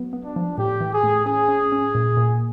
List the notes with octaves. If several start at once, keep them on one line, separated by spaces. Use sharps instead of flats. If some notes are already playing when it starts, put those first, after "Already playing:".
Already playing: F#3 B3
B3
D4
F3
A2 G4
E3
G#4
A2
C#4 G#4
C#4
C#4
A#2
A#2